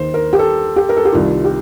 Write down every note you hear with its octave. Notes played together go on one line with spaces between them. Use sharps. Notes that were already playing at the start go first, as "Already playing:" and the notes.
Already playing: D#2 D#3 C5
A#4
G4
A4
G4
A#4
A4
G4
C2 C3 D#3 F4
G4